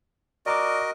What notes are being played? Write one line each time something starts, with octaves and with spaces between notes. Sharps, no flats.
F#4 A#4 D5 D#5 A#5 D6